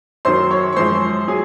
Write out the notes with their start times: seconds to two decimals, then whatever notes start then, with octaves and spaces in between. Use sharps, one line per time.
0.25 F#2 D#3 F#3 C5 C6
0.51 C#5 C#6
0.73 C#6
0.76 F#2 F3 G#3 C5 C6
1.28 F#3 G#4 G#5